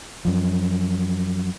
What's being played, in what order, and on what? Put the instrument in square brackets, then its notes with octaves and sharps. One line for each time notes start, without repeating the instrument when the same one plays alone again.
[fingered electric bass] F#2 F3